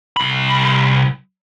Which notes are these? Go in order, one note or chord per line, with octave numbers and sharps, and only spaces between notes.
C2 B5